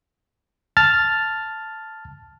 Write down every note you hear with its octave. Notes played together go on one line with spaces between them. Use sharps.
A5 F6 A6